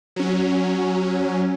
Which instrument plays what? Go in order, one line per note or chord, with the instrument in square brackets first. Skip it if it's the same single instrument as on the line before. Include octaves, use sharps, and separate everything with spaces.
[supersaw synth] F#3 C#4